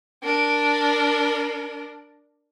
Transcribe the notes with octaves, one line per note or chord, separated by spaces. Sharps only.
D4 A#4